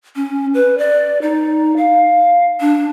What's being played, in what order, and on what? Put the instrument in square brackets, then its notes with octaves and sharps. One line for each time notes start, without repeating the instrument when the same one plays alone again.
[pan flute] C#4
B4
D5
D#4
F5
D4